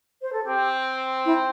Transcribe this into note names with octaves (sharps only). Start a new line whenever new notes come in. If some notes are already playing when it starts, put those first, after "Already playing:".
C5
A4
C4 G4
E4